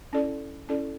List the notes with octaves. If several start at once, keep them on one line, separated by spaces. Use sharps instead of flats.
C#4 E4 A4 D5
C#4 E4 A4 D5